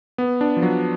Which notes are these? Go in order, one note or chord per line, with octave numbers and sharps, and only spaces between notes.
B3
D4
F3
F#3